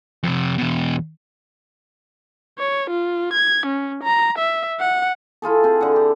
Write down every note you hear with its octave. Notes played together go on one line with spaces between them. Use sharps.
F2 C3
E2 B2
C#5
F4
G#6
C#4
A#5
E5
F#5
E4 F4 G#4 A4
C4 G#4
D3 F#5
G4